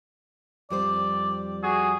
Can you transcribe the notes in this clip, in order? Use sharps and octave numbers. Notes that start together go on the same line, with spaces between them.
F2 G3 C5 D5
F#4 G#4